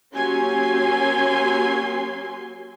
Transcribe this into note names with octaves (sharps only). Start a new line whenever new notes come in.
F#3 A#3 C#4 G4 G#5 C6